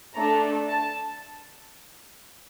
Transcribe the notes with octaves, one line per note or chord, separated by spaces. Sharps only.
A3 D4 A4 A#5
A5